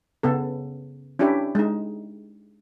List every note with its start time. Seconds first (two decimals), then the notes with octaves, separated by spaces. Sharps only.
0.23 C#3 B3 A4
1.19 C#4 D4 E4 G4 C#5
1.55 G#3 D#4